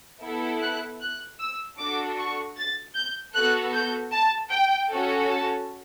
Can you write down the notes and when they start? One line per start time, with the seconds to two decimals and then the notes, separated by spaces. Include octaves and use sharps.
0.22 B3 E4 A4
0.62 F#6
1.01 F#6
1.40 E6
1.78 D4 F#4 A4 D6
2.18 C#6
2.57 A6
2.95 G6
3.35 B3 F#4 A4 F#6
3.73 G6
4.12 A5
4.51 G5
4.90 C#4 F#4 A4
5.30 A5